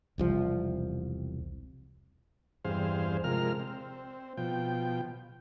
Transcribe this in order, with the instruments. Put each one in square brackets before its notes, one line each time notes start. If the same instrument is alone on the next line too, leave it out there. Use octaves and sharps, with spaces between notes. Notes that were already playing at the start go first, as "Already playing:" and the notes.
[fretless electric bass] E1 C2 F3
[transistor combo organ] E2 G2 C4 G#4 C5 F5
C3 F3 G#3 A#4 F6
C4
B2 F3 G5